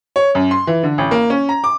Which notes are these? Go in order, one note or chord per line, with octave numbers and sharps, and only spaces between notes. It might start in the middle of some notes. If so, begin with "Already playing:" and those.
C#5
F#2
C6
E3
D3
A1
A#3
C#4
A#5
D6